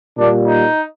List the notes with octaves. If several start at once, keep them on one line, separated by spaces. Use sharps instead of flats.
A#2 G3 A#3 D4
D#4